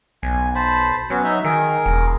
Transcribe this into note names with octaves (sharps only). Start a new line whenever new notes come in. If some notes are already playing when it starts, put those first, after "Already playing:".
B1 G#5
C5 A5 B5
F#3 B3 C#4
D#4 E5
D#3 G#4 A#4
E1